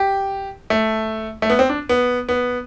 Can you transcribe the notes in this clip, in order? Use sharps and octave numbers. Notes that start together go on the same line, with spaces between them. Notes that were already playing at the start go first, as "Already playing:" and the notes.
Already playing: G4
A3
A3
B3
C4
D4
B3
B3